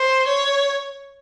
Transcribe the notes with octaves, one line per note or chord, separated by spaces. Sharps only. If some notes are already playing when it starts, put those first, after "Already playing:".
Already playing: C5
C#5